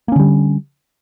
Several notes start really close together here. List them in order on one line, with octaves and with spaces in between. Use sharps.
A#3 C#4 D3 G3